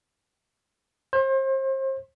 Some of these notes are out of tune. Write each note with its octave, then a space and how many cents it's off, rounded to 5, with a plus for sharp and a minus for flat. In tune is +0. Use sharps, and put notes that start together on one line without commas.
C5 +35